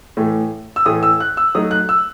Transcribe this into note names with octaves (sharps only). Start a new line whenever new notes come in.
A2 E3 A3
E6
A2 E3 A3 D#6
E6
F#6
E6
F#3 A3 D#4 D#6
F#6
E6